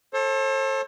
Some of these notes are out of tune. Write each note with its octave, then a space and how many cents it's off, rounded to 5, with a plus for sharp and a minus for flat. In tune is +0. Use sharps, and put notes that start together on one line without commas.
A4 +0 C5 +45